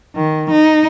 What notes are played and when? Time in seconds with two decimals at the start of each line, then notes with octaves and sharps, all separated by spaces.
0.16 D#3
0.51 D#4